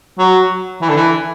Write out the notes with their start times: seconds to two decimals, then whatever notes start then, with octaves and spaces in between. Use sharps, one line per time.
0.18 F#3
0.82 E3
0.89 D3
0.96 E3